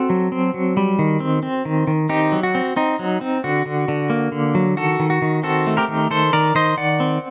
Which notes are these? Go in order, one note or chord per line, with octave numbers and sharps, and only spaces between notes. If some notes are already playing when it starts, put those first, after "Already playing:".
Already playing: C4 F#4 A4
F#3
C4
F#3
G3
D#3
C4
C4
D#3
D#3
C4 D#4 G4
F#3
F#4
C4
C4 D#4
F#3
C4
D3 F#4
D3
D3
A#3
D3
F#3
D#3 F#4 A4
D#3
F#4
D#3
C4 F#4 A4
A3
G4 A#4
D#3
D#3 A4 C5
D#3 A#4 D5
D#3 C5 D#5
D#3 D5 F#5
C4